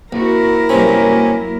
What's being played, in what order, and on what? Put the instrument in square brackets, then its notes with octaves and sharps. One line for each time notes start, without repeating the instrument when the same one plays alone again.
[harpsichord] A#1 [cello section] C4 F#4 [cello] E4 A#4
[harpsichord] G2 C3 C4 [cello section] F#3 A#3 [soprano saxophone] C#4